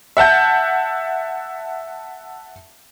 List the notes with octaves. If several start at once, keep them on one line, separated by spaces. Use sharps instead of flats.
E5 F#5 A5 G6